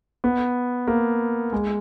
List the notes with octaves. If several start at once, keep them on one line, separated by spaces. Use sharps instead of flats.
B3
A#3
G#3